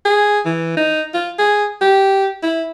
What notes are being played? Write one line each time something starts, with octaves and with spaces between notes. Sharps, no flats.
G#4
E3
D#4
F4
G#4
G4
E4